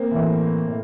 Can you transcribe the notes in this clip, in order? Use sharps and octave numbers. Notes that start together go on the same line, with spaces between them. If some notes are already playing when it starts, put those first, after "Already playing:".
Already playing: A#3 C4
A2 E3
A2